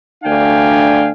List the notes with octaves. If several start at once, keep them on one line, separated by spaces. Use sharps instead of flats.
D2 D4 F5 G5 G#5